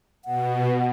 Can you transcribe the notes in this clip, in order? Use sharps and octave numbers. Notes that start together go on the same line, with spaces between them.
B2 F#5